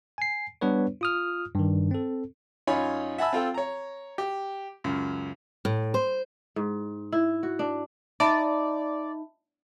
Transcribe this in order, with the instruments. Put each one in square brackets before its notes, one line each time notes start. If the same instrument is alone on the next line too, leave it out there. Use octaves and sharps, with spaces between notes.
[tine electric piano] G#5 C7
G3 B3 D4 B4 C#5
F4 D#6 F6
G2 D#3
C4 A4
[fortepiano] F#2 D#4 F4 C#5 G#5 B5
E5 F#5 G#5 A5 B5 E6
C4 F4 A4 G5
C#5 A#5
G4
C#2 F#2
[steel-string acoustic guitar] A2
C5
[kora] G#2
E4
F#4
D4
[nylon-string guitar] D#4 [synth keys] D5 [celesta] E5 A5 B5